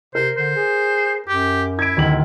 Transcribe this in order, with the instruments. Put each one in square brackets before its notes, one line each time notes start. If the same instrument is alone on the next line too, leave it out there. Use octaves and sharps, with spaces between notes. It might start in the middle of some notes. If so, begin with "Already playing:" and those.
[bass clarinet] C3 [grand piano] A#4 [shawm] C5
[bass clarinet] D3 [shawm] C5
[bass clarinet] G#4
[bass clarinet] F#2 [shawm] G4
[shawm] E4 [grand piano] G#6 D7
[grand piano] D1 D#3 F#7